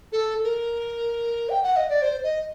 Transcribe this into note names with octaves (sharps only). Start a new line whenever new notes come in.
A4
A#4
G5
F#5
D#5
D5
C5
D#5